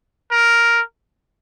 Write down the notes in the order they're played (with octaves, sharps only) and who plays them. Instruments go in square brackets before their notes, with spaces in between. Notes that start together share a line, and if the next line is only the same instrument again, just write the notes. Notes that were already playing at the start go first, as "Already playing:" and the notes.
[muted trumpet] A#4